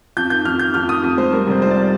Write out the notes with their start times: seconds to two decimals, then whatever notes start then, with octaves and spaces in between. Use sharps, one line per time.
0.17 F2 G6
0.30 D#3 G6
0.45 F2 F6
0.59 D#3 G6
0.74 F2 F6
0.89 D#3 D#6
1.03 F2
1.17 G#3 C5
1.32 G3 A#4
1.47 F1 C5
1.62 G3 C5
1.70 D5